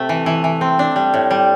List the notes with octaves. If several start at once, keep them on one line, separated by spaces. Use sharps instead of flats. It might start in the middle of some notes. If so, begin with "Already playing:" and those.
Already playing: C3 A3
E3
E3
E3
C4
D4
G3
A2
G3